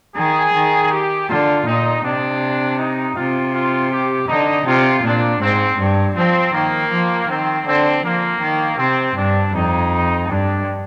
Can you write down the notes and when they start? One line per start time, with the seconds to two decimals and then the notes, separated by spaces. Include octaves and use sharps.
0.16 D#3 G#4
0.54 D#3
0.91 G4
1.29 D3 F4
1.65 A#2 D#4
2.04 C3 D4
2.78 D#4
3.15 C3 F4
3.53 F4
3.91 G4
4.28 D3 D#4
4.66 C3 F4
5.03 A#2 D4
5.41 G#2 C4
5.78 G2
6.17 F3 C4
6.54 D#3 A#3
6.91 F3
7.29 D#3 C4
7.67 D3 C4
8.03 F3 A#3
8.41 D#3
8.78 C3 C4
9.16 G2 D4
9.54 F2 D#4
10.29 G2 D4